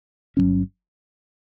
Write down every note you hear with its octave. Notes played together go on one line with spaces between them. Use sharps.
G1 G2 F#3 C#4